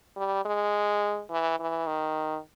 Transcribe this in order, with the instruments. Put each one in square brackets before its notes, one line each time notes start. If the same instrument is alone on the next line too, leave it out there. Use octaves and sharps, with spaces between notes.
[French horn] G3
G#3
E3
E3
D#3